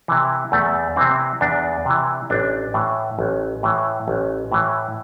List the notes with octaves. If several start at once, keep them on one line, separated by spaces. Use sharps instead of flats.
C3 E3
E2 A3
C3 E3 C4
E2 D4
C3 E3
A1 D4
A2 E3
A1
A2 E3
A1
A2 E3